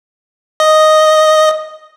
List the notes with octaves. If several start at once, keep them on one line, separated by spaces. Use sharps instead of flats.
D#5